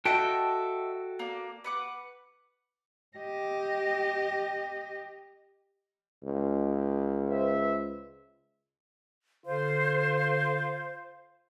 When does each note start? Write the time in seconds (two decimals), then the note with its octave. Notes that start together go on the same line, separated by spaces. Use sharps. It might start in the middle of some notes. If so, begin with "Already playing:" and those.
0.05 F#4 A4 D#5 E5 G5 A5
1.19 A#3 D5
1.64 B4 F#5 D6
3.17 G4 D#5
6.24 C#2
7.29 B4 C5 E5
9.46 D3 F4 C5